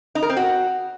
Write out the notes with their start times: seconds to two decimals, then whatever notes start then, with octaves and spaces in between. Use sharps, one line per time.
0.15 D#4
0.22 A#4
0.30 C4
0.37 F#4